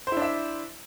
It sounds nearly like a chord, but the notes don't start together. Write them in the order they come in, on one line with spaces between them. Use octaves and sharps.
C5 E4 D4 E5